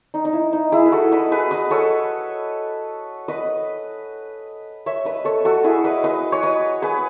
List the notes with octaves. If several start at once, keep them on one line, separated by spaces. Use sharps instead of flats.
D#4
D#4
E4
D#4
E4 G#4
B4
F#4 A4
B4 D#5
G#4 B4
B4 D#5
A4 C#5
B4 D#5
C#5 E5
B4 D#5
A4 C#5
F#4 A4
E4 G#4
B4 D#5
B4 D#5
C#5
B4 D#5
G#4 B4